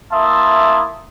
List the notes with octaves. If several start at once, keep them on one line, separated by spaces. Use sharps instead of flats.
A#3 E4 E5 A5 C6 D#6